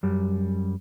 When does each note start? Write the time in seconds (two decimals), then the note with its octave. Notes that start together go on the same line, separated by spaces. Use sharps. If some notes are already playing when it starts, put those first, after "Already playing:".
0.03 F#2 G3